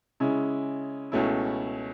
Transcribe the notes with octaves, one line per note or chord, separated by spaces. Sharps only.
C#3 G#3 C#4 E4
C#2 B2 A3 C#4 E4